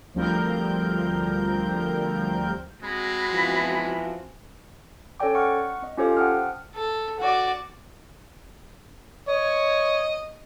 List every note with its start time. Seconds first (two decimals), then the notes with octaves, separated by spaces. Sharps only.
0.14 D2 F3 G3 C4 A#4 G6
2.83 G#3 C4 F#4 B5
3.31 E3 F3
5.20 C#4 A4 C#5 D5 G5 D6
5.34 F#5 C#6 F6
5.82 C4 D#5
5.97 C#4 F4 G4 A4 C5 F5
6.17 F#5 G5 A5 D#6 F6
6.75 A4
7.20 F#4 D5
9.28 C#5 D#5